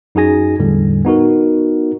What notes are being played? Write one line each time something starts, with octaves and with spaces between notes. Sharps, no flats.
F#2 D#4 F#4 G#4 G#5 A#6
E2 A2 D3 G3
B3 D#4 F#4 A#4